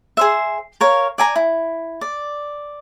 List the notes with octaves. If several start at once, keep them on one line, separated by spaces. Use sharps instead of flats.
G#4 C5 E5
A#4 C#5 F5
D5 G#5 A#5
E4
D5